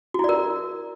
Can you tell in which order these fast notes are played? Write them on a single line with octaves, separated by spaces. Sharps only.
F#4 E4 D5 A#4